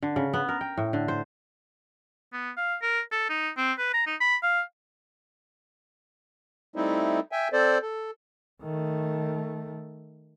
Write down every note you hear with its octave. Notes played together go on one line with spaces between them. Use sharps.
D3
C#3
B3
A#4
G5
A2
D3
C5
B3
F5
A#4
A4
D#4
C4
B4
A#5
D#4
B5
F5
G3 A3 C4 D#4 E4
E5 G5 G#5
C4 A4 C5 D5
A4
D#3 A3